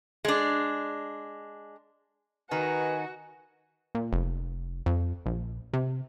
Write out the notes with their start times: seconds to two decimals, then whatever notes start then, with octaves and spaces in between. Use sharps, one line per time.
0.25 G#3 D4
2.51 D#3 D#4 F#4 B4 G#5
3.95 A#2
4.13 F1
4.86 F2
5.26 A#1
5.73 C3